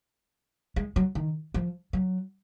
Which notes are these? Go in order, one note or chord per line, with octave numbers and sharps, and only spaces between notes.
G#3
F#3
D#3
F3
F#3